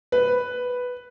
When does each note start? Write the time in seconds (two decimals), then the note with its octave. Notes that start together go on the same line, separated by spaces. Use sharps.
0.12 B4